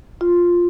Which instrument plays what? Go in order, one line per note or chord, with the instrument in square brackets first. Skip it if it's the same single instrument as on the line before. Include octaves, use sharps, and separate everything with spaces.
[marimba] F4